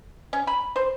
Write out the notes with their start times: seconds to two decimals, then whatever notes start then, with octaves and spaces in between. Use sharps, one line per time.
0.33 C#4
0.47 B5
0.76 C5